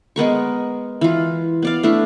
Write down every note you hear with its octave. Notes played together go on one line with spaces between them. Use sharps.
G#3 B3 A#4 C#6
E3 F4
B3 D5 F5
A3 D4 E4